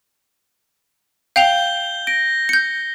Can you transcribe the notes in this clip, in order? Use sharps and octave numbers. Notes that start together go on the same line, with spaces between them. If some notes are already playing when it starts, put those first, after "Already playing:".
F5 G5 G6 F7 G7
A#6 D7
G6 C#7